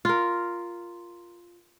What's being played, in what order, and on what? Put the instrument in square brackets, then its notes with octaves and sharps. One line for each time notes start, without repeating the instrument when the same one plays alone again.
[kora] F4 A#4